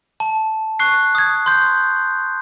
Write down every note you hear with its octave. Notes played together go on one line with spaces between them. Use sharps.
A5
C#6 F#6 C7
D#6 G#6
C6 G6